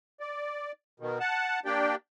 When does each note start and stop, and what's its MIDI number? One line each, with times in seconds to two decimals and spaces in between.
0.20 0.72 74
1.00 1.18 47
1.00 1.18 51
1.20 1.60 78
1.20 1.60 81
1.65 1.95 58
1.65 1.95 62
1.65 1.95 67
1.65 1.95 74
1.65 1.95 79